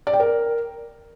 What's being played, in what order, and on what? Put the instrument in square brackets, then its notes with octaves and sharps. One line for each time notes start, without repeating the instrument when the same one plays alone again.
[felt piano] D5
G5
A#4